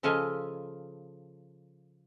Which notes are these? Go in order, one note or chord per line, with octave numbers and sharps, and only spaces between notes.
C#3 F3 A4 D#5 F5 G#5